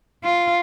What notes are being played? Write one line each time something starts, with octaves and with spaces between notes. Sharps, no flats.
F4